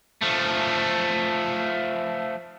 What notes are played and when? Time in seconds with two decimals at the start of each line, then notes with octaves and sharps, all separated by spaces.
0.21 F3 A3